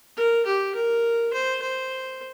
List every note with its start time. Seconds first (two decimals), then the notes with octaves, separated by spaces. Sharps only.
0.17 A#4
0.46 G4
0.75 A#4
1.33 C5
1.62 C5